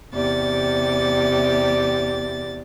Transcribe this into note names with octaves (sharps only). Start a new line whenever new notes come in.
E2 C3 G4 D5 A6